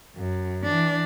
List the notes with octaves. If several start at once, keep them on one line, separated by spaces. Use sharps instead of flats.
F#2
E3 D4